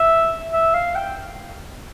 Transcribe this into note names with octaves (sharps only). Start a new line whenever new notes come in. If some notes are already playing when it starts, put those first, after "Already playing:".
Already playing: E5
E5
F5
G5